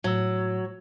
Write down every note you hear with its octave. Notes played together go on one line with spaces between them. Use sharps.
A2 F#3 E6